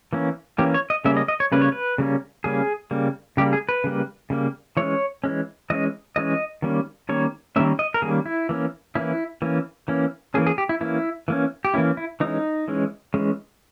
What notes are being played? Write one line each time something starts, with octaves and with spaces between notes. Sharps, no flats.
E3 A#3 C#4
E3 A#3 C#4 G4
C#5
D#5
C#3 G3 A#3 C#4 E5
D#5
D#5
C#5
C#3 G3 A#3 C#4 B4
C#5
B4
C#3 G3 A#3 C#4
C#3 G3 A#3 C#4 G#4
C#3 G3 A#3
C#3 G3 A#3 G4
G#4
B4
C#3 G3 A#3
C#3 G3 A#3
E3 G#3 C#4 C#5
E3 G#3 C#4
E3 G#3 C#4 D#5
E3 G#3 C#4 D#5
D#3 G3 A#3 C#4
D#3 G3 A#3 C#4 C#5
D#3 G3 A#3 C#4 E5
D#5
A#4
D#3 G3 A#3 C#4 G#4
E4
E3 A#3 C#4
E3 A#3 C#4 E4
E3 A#3 C#4
E3 A#3 C#4
E3 A#3 C#4 G#4
G#4
G4
E4
E3 A#3 C#4 E4
E3 A#3 C#4
G4
E3 A#3 C#4 E4
E4
E3 G#3 C#4 D#4
E3 G#3 C#4
E3 G#3 C#4